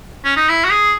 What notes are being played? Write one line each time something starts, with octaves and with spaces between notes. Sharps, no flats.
C#4
D#4
E4
F#4
G#4